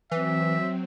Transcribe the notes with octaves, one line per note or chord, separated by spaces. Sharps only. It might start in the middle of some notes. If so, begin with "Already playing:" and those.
E3 F#3 C4 E5